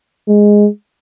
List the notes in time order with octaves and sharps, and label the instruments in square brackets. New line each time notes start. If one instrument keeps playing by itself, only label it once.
[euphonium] G#3